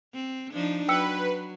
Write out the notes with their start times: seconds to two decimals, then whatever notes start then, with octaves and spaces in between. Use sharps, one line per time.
0.14 C4
0.52 F3 D4 D#4
0.88 F#3 B4 G5 E6 C#7